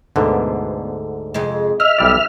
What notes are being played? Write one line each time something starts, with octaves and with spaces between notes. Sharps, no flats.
D2 G#2 B2 D3
F2 C3 G#3
D#5 E5 F6
B1 G3 D5